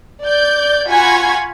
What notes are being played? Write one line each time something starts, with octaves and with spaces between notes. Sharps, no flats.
D5 G6
F4 F#4 G#5 B5 C#6 G#6